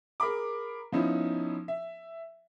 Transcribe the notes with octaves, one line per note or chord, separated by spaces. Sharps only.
G#4 A#4 A#5 B5 D6
F3 B3 C#4 D#4 E4
E5